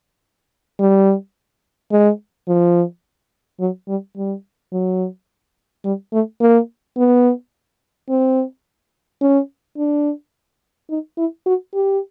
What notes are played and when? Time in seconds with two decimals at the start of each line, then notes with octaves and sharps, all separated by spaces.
0.80 G3
1.92 G#3
2.48 F3
3.60 F#3
3.88 G3
4.17 G3
4.73 F#3
5.85 G3
6.13 A3
6.41 A#3
6.97 B3
8.09 C4
9.21 C#4
9.77 D4
10.90 D#4
11.18 E4
11.46 F#4
11.74 G4